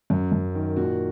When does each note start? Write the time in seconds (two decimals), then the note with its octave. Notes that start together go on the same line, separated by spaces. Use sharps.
0.10 F#2
0.32 F#2
0.55 D#3
0.76 A#2 F#4